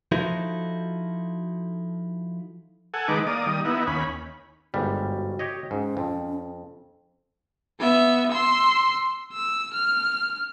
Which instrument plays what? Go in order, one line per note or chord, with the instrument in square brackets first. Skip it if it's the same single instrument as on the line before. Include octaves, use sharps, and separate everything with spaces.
[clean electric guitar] F3 D#4 E4 F#4 A4
[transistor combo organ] A4 F#5 G#5
D#3 G#3 D#4 B4 D6
A#3 D5 D#6
D#3 G3 D#6
B3 D#4 E4
D#2 C#4 B5
[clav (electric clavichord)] G1 G#2 G3 [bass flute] F#4
[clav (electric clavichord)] G4 C#5 D#5
[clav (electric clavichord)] G#2 [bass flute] C#4
[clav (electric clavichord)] F2
[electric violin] B3 E5
C6 E6
E6
F6